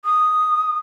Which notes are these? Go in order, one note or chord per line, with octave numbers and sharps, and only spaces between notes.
D#6